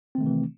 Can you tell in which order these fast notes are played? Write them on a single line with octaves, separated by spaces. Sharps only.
C4 D#3 A3 C3 E3